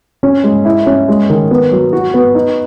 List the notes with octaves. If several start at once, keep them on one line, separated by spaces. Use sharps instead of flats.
C#4
G#3
E4
C#4
G#3
D#3
B3
F#3
F#4
B3
D#4